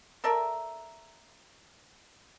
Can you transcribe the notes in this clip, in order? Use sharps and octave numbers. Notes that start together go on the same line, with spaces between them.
A4 A#4 D5 E5